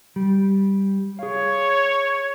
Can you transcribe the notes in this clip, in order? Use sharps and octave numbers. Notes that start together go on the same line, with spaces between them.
G3
G#4 C#5 F5